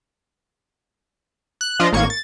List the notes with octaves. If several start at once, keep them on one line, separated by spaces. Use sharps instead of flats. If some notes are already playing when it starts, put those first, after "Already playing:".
F#6
F3 D4 F4 D#5
A1 A#3 C#6 G#6
A6